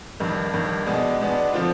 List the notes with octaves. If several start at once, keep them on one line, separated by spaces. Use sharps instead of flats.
G1 G2 D#3
G1 G2 D#3
B2 G#3 B3 D4
B2 G#3 B3 D4
D3 F3 C4 F4